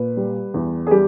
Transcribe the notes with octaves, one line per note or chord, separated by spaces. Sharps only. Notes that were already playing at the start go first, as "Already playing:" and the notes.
Already playing: A#2 B4
G3
E2
G#4
G3 G4